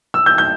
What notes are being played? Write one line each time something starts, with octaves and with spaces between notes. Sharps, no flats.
E6
G6
G6